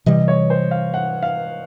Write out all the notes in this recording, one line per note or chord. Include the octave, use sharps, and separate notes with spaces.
C3 E3 G3 D#5
C#5
C5
F5
F#5
F5